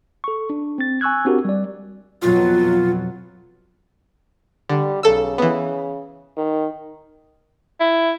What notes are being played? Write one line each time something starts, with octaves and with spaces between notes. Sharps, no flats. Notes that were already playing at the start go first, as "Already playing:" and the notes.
A4 C#6
D4
C4 A6
G#5 C#6 E6 F#6 G#6
C4 D4 F#4 G4 A#4
G3 D5
F2 B2 F#3 F4
D3 G3
B1 C#3 A4 E6
E3 B3
D#3
E4